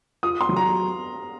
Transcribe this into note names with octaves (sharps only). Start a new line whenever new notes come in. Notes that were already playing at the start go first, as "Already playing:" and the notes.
F4 D#6
C6
F#3
A#5